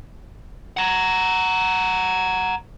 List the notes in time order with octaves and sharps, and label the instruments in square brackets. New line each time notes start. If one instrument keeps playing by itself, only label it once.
[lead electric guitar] F#5 A#5